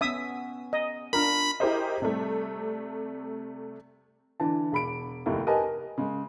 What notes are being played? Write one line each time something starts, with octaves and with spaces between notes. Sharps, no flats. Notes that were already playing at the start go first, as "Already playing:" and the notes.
B3 C#4 E5 D#6
D#5
D4 F4 A#4 B5
E4 G4 G#4 A#4 C5 D#5
C3 G3 A3
D3 E3 A5
E1 B5 D7
F1 D#2 E4
G4 A#4 B4 D#5 G#5 A5
A#4
C#3 G#3